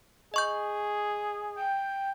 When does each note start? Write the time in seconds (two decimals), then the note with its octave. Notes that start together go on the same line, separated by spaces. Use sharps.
0.34 G#4 D#5 C#6 G6
1.56 G5